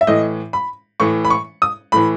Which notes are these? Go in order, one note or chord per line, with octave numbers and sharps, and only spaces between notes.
E5
A2 E3 D#5
B5
A2 E3 C#6
B5
C#6
D#6
A2 E3 B5